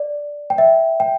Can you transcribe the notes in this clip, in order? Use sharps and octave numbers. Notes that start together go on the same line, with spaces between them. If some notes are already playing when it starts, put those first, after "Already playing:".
Already playing: D5
G5
E5
G5